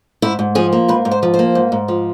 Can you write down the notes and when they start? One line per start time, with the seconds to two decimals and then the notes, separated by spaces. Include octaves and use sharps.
0.22 G#2 E4
0.39 G#2
0.55 F3 G#4
0.73 A#3
0.88 G#2 B4
1.05 G#2
1.11 C5
1.23 F3
1.34 C5
1.39 A#3
1.55 G#2
1.72 G#2
1.88 F3